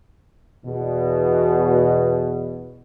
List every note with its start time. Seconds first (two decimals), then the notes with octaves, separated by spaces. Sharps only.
0.65 E2 B2